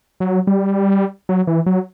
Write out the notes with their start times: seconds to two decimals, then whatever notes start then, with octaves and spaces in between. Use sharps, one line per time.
0.20 F#3
0.47 G3
1.29 F#3
1.47 E3
1.66 F#3